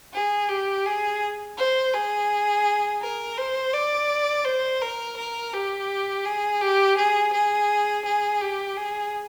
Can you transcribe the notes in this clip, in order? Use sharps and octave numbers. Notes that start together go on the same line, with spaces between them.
G#4
G4
G#4
C5
G#4
A#4
C5
D5
C5
A#4
A#4
G4
G#4
G4
G#4
G#4
G#4
G4
G#4